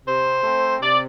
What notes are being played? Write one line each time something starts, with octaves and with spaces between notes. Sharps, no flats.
C3 C5
A3 C4
C3 D5